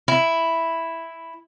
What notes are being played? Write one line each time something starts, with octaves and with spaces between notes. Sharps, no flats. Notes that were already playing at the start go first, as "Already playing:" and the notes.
E4